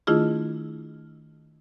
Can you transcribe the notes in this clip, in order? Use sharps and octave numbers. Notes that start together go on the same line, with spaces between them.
D#3 A3 D4 E4 F4 G#4